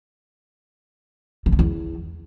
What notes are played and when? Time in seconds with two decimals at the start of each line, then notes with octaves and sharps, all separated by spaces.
1.46 D#3
1.52 D3
1.59 E2